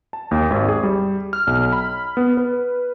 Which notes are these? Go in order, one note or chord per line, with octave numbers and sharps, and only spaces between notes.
A5
D#2
G#1
G#4
G3
F6
B1
B5
B3
B4